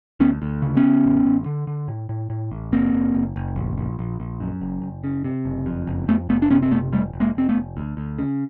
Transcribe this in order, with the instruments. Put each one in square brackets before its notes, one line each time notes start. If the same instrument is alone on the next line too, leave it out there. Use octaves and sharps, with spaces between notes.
[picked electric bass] D2 B3 C#4
D2
C#3
B3 C#4
C#3
A1
A1
D3
D3
A2
A2
A2
A1
F#1 A#3 C4
F#1
F#1
F#1
A#1
A#1
A#1
A#1
F#2
F#1
F#1
C#3
C3
F#1
F2
F#1
F2 A3 B3
F#1 A3 B3
D4
C3 B3 C#4
C4
F#1 A3 B3
F1 G3 A3
F1
G#3 A#3
F1 C4
A3 B3
F1
D2
D2
C#3